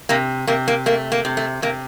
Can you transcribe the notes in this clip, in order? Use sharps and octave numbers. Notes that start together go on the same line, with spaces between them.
C3 A#3
C3 A#3
A#3
A3 A#3
A#3
C3
A3
C3 A#3